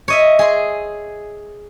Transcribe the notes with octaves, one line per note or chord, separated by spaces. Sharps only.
C#5 D#5 E5
G#4 C6